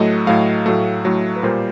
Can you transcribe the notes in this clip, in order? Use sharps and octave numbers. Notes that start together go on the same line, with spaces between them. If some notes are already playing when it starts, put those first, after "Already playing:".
Already playing: A2 F#3 A3 D#5
A2 F#3 A3 F5
A2 F#3 A3
A2 F#3 A3
B4
A#2 G3 A#3 C5